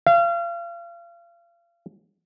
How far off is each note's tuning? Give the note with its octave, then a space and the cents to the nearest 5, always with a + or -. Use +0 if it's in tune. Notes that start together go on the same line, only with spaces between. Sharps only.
F5 -35